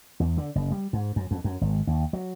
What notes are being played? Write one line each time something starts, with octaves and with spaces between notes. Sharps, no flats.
E2
D3
F#1
G3
G#2
F#2
F2
F#2
G#1
D#2
F#3